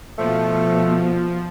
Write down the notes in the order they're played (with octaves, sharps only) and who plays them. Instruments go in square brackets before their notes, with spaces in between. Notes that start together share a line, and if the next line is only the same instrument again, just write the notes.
[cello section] B2 B3 [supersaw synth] F3 [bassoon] A3